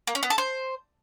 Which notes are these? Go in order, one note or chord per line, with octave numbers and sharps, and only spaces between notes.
A#3
C#4
B3
A4
C5